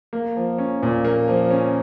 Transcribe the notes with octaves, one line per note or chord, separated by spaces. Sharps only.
A#3
F3
C#4
A#2
A#3
F3
C#4